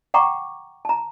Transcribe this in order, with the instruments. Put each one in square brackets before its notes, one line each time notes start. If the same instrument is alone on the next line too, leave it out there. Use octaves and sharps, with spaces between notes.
[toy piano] F#5 G5 A#5 C#6 D6
A5 A#5